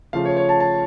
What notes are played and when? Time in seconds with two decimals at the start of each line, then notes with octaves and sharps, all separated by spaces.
0.13 C#3 F3 A3 F4 F5
0.25 C#5
0.37 C#5
0.49 A5
0.60 A5